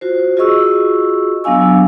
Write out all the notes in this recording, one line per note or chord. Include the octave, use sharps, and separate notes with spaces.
F4 F#4 C5
F4 F#4 G#4 D#5 C#6 E6
F#3 B3 D4 F5 G#5 E6